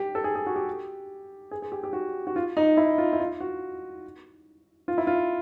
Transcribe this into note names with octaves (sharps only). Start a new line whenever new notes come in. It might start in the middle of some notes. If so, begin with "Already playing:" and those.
Already playing: G4
A4
G#4
G#4
F#4
G4
G#4
G#4
G4
G4
F#4
F#4
F4
D#4
E4
F4
E4
F4
F#4
F4
E4
F4